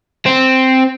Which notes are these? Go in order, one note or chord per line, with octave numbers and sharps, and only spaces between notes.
C4